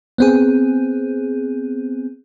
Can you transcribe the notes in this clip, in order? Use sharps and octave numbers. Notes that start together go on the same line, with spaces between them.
B3 C4 G#4